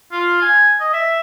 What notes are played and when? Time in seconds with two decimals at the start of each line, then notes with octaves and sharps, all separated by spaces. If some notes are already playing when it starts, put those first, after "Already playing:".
0.12 F4
0.42 G#5
0.80 D#5
0.93 E5